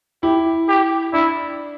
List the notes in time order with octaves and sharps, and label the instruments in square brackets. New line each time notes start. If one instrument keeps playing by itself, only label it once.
[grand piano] E4 [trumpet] G4
[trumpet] G4
[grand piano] D4 [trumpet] E4